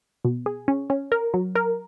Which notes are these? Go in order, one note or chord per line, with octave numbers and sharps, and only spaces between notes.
B2
G#4
C#4
C#4
A#4
F#3
A#4